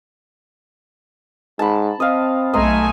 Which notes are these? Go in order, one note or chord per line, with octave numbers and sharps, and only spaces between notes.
G#2 A5 B5
C4 D#5 F5
B1 A3 D#5 G#5 A#5 C6